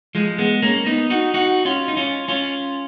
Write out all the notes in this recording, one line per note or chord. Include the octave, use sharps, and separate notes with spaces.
F3 G#3
G#3 B3
A#3 C#4
B3 D#4
D#4 F#4
D#4 F#4
C#4 F4
D#4
C#4 F4
C#4 F4